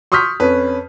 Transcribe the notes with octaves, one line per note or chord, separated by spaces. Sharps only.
C6 C#6 D#6 F6 G6 B6
F2 C#4 B4